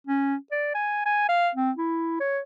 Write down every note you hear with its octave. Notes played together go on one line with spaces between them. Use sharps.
C#4
D5
G#5
G#5
F5
C4
E4
C#5